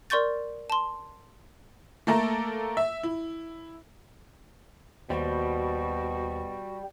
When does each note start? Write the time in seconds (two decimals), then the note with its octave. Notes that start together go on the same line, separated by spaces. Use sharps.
0.10 A#4 D5 C6 C#6 G6 A6
0.70 A5 C6
2.07 A3 A#3 A4 A#4
2.77 E5
3.03 E4
5.10 D#2 B2 G3 F#4 C5